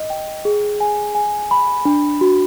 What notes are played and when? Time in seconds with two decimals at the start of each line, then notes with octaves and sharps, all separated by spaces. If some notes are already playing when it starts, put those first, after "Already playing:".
Already playing: D#5
0.10 G5
0.45 G#4
0.80 G#5
1.15 G#5
1.51 B5
1.85 D4
2.21 F#4